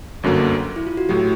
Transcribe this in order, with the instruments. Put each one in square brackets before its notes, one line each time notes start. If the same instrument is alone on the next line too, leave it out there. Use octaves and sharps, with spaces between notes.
[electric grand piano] G1 F#2 D3 F#3 A#3
[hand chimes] E4
F4
F#4
[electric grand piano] A2 F#3 [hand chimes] G4